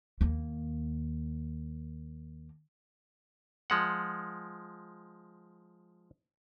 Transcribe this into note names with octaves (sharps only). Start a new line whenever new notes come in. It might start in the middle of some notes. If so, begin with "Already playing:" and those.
D#2 A#3
F3 G#3 F#5